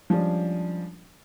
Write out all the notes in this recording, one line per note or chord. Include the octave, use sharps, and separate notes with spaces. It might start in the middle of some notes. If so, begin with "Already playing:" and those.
F3 G3 G#3 C#4 D4